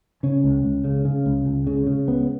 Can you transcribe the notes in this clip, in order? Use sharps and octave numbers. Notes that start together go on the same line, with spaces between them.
C#3 C#4
C#2
C#2
C#3
C#3
C#2
C#2
C#3
C#3
C#2 B3